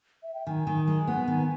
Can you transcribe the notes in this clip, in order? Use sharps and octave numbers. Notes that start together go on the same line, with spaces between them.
E5
G5
D#3 G#5
D#3
G#3
B3
D#3